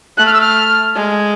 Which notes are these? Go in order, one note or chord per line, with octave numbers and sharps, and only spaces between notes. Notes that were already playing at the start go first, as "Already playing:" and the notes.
A3 F#6
F6
E6
F6
G#3